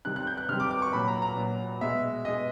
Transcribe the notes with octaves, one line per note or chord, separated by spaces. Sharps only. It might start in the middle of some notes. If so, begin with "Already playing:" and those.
C3 D#3 G3 F#6
F#6
G6
F#6
C3 D#3 G3 F6
D6
D6
C#6
A#2 F#3 B5
A#5
A#5
A#2 F#3
B2 G#3 E5
B2 G#3 D#5